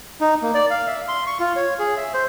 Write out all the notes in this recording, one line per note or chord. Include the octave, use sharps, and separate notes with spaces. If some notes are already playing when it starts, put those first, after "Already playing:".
D#4
A#3
D5
F5
E5
C6
C#6
F4
C#5
G#4
E5
C5